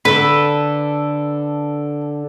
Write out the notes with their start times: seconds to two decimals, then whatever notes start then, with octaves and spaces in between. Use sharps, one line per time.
0.05 D3 A4 B4